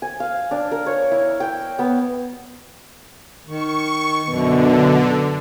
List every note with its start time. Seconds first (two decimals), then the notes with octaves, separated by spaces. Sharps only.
0.02 G#5
0.20 F5
0.51 D4
0.71 A#4
0.86 C#5
1.11 E4
1.40 G5
1.79 B3
3.47 D#3 C#6
4.29 F#2 B2 D3 B3